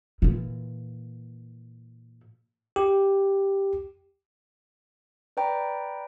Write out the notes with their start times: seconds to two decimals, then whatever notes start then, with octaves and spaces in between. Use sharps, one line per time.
0.22 A#2 E3
2.76 G4
5.37 B4 D5 G5 A#5 B5